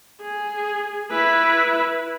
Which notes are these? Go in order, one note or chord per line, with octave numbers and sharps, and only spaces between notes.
G#4
E4 B4